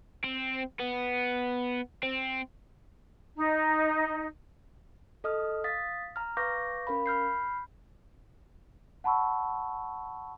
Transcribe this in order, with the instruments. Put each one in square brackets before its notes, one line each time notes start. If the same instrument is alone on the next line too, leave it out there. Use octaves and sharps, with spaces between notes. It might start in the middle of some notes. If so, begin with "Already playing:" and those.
[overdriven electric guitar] C4
B3
C4
[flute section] D#4
[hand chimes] A4 D#5 D#6 F6
F5 D#6 A6 B6
A#5 F6
B4 F5 C#6 D6 G6 A#6
C#4 A#4 F5 B5
B5 F6 G6 C7
[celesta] F#5 A5 B5 C#6 E6